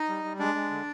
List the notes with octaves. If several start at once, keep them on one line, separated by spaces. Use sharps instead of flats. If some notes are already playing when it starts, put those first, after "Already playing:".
Already playing: D#4 D#5
G3
G3
G#3 D4 D5
G#3
D3